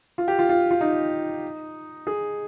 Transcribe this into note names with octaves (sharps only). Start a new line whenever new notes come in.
F4
G4
F4
F4
F4
D#4
G#4